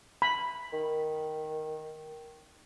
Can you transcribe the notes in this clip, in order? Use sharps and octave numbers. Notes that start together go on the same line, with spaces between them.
B5
D#3